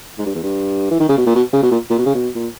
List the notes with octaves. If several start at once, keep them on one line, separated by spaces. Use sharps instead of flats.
G#2
G2
E2
G2
E3
D#3
C#3
B2
A#2
B2
C#3
B2
A#2
A#2
B2
C#3
B2
A#2